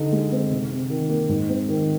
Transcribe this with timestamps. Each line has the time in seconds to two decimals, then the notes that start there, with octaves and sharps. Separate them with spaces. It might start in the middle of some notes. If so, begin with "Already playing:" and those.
Already playing: D3 D#4
0.12 G#3
0.32 C4
0.51 C3
0.71 C3
0.90 D#3
1.09 A#3
1.29 G#2
1.49 C4
1.69 D#3